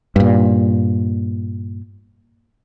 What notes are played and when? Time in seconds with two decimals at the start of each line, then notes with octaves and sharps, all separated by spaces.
0.16 G2 A#2